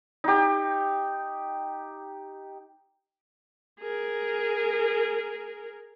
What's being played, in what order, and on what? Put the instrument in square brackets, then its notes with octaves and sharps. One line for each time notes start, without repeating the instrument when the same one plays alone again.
[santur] D#4 G4
[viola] G#4 A#4